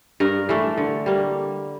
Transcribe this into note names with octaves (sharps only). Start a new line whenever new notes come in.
G2 A#4
E3 A3
D3
G3 A#3